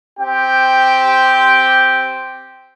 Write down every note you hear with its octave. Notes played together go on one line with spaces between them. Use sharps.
C4 G4 G5